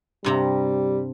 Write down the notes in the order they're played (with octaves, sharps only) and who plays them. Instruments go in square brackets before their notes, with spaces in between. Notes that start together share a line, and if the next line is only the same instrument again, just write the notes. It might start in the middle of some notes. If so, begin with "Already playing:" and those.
[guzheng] G2 C3 A#5 [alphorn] G3